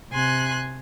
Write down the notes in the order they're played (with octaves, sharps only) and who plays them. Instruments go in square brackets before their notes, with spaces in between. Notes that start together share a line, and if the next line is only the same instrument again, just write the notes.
[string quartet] C3 G#5 C6 F#6